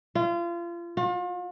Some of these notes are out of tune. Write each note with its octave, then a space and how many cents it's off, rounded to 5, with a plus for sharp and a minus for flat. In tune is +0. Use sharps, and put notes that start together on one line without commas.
F4 -30
F4 +40